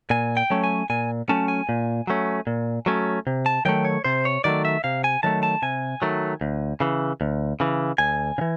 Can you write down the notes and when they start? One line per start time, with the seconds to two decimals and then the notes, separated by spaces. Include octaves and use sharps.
0.10 A#2 G#5
0.37 G5
0.50 F#3 A3 C#4
0.64 G#5
0.90 A#2 G#5
1.29 F#3 A3 C#4 A5
1.48 G#5
1.69 A#2
2.07 F#3 A3 C#4
2.47 A#2
2.86 F#3 A3 C#4
3.27 C3
3.46 A5
3.65 D#3 F#3 A3 G5
3.85 C#5
4.04 C3 C5
4.25 C#5
4.44 D#3 F#3 A3 D5
4.65 E5
4.84 C3 F5
5.04 G#5
5.23 D#3 F#3 A3 A5
5.43 A5
5.62 C3 G#5
6.02 D#3 F#3 A3
6.41 D2
6.80 C#3 E3
7.21 D2
7.60 C#3 E3
7.98 D2 G#5
8.38 C#3
8.41 E3